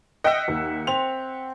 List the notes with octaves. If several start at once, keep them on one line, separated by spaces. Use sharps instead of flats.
D#5 E5 F#5 G5
D#2
C4 F7